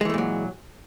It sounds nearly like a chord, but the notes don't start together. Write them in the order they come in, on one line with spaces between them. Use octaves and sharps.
G#3 E3 A3 A#2 F#3